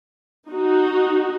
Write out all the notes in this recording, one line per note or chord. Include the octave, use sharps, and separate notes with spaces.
D#4 F#4